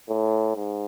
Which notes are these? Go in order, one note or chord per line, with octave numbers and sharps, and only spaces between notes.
A2
G#2